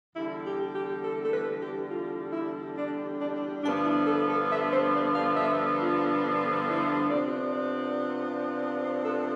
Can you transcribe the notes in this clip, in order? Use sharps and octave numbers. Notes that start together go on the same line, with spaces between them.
E2 D3 G3 E4
G4
G4
A4
A4
B4
G4
F4
E4
D4
D4
D4
G2 D3 F3 B3 D4
E4
A4
A4
E5
C5
D5
F5
E5
F4
D4
E4
C3 F3 B3 D4 D5
D5
C5
A4